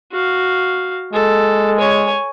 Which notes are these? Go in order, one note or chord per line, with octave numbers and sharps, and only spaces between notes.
F#4 F5
G#3 A4
C#5 G#5